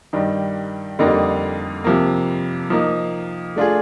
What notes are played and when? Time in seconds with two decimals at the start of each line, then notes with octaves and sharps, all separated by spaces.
0.13 G2 D#3 G3
0.99 F2 D3 G3 A#3 D#4
1.84 C3 F3 A#3
2.70 F3 A#3 D#4
3.56 A3 D4 F4 G#4